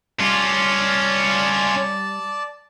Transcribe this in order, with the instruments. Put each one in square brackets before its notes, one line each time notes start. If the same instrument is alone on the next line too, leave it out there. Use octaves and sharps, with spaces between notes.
[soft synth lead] G3 [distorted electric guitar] C#4 F4 [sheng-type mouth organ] D5 A5